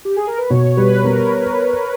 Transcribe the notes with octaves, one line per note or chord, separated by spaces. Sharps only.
G4
G#4
A#4
B4
B2 C#5
G3 B4
B3 A#4